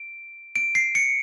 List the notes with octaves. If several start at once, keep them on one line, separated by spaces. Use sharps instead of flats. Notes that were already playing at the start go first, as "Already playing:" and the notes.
Already playing: D7
D7
C7
C#7